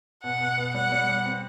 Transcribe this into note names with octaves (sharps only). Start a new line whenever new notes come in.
B2 F#5
B2
B3
G3 F#5
G3
G3
C4